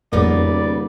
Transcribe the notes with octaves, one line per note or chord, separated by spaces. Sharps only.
D#1 F2 A2 C#3 A#3 B3 D5